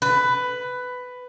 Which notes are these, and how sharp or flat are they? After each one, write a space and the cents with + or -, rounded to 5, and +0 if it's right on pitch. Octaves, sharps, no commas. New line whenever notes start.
B4 +10